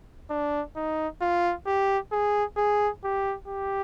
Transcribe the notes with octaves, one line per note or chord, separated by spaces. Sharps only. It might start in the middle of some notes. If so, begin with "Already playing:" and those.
D4
D#4
F4
G4
G#4
G#4
G4
G4